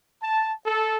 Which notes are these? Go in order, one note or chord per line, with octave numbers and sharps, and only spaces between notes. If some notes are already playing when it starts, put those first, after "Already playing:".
A5
A4